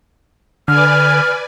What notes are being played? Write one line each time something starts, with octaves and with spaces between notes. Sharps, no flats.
D3 B4 D5 G#5 F6